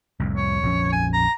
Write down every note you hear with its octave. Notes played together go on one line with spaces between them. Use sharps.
C2 F2 A2
C#5
A#1 F2 C#4
G#5
A#5